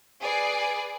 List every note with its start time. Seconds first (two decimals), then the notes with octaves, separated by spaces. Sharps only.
0.22 G#4 B4 D5 C7